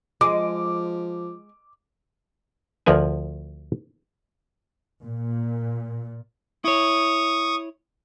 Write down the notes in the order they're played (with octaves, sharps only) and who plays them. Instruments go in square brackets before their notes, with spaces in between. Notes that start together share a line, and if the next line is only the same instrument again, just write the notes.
[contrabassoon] F3 [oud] G#3 [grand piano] D6
[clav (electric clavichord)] D2 F3 A#4 B4 G#5
[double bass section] A#2
[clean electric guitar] E4 C#5 [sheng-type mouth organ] C#6 D#6